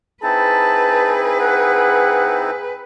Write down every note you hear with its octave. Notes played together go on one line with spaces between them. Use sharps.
C4 D#4 E4 G#4 B4 A5
F#5